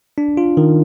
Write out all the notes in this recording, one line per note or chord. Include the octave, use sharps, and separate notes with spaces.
D4
F4
D#3